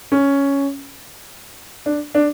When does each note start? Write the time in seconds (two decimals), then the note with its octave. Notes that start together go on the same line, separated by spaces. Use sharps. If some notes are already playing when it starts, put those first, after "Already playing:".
0.12 C#4
1.86 D4
2.15 D4